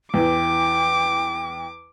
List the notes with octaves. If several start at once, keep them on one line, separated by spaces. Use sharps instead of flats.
E2 E3 G5 D6